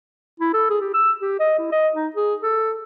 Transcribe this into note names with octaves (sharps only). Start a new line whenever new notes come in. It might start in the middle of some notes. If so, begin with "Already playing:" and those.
E4
A4
G#4
G4
E6
G4
D#5
E4
D#5
D#4
G#4
A4